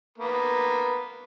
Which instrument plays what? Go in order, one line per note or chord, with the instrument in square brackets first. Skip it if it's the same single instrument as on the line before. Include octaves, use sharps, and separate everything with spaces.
[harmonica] A#3 B3